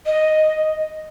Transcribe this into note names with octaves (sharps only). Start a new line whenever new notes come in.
D#5